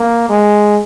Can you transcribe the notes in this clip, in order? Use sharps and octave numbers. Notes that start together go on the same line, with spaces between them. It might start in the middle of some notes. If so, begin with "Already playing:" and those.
Already playing: A#3
G#3